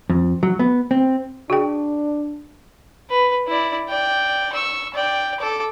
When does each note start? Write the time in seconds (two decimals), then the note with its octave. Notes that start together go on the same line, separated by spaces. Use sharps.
0.10 F2
0.43 F#3
0.59 B3
0.91 C4
1.50 D4 F#4 G#4 G5
3.10 B4
3.47 E4 D5
3.89 D5 G5
4.53 C#6 E6
4.94 D5 G5
5.40 A4 D6